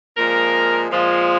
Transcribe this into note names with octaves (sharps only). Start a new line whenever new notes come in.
A#2 F3 G#3 A#4
A#2 F3 G#3